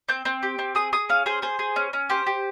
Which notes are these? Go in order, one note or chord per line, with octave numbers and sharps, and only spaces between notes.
C4 G6
C4
G4
C4
G#4 D#6
G#4 D#6
C#4 F5
G#4 C5
G#4 C5
G#4
C#4
C#4
G4 C5
G4